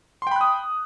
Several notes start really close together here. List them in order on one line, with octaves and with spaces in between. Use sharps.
C6 G5 B5 F#6 D#6